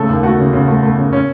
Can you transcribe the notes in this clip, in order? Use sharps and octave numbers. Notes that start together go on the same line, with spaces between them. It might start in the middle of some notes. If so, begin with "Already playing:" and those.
Already playing: C#3 A3 A4
D#2
A3 F#4
C#3
C#3
A3
A3
C#3
C#4